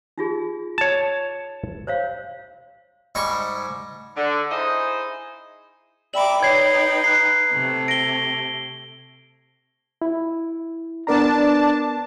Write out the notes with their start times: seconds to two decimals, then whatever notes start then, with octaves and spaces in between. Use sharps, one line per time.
0.18 D#4 F4 G#4
0.78 C#5 A5
1.87 C5 C#5 F5
3.15 G#2 G3 C#6
4.17 D3
4.51 D#4 E4 G#4 C5 D#5
6.14 D5 E5 G5 A#5 B5 D6 F#7
6.43 D#4 B4 C#5 G5 G#6 C7
7.04 A#5 F#6 C7
7.54 C3 A3
7.88 A#6 D7 G7
10.02 E4
11.07 B3 D4 A#4 A5 A#5